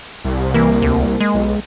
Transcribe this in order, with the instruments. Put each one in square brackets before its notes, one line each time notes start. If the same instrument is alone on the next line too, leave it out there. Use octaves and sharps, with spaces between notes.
[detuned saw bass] C2
[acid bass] E3 [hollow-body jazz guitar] A#3
[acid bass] D2
G#3
[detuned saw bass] B1